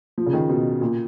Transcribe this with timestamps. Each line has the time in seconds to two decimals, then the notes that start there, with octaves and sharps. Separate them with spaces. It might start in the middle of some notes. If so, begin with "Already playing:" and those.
0.18 F3
0.26 C#3
0.33 D#3
0.49 B2
0.81 A#2